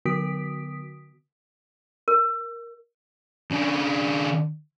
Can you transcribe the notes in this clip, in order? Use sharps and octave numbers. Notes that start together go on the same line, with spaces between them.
D3 B3 F#4 D#6 B6 D7
A#4
C#3 D4